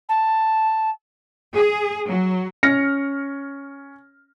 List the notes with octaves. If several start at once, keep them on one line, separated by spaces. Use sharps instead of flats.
A5
G#4
F#3
C#4 F6 A#6 C#7